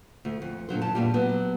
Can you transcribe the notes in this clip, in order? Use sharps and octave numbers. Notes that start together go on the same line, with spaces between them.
D2
F2
A#2 D3 F#3 C5
F#2 A5
E2 A#2 G3
F#3 B3